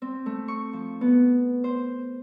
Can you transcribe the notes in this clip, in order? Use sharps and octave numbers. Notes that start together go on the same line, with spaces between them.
C4
A3
C#6
F3
B3
C5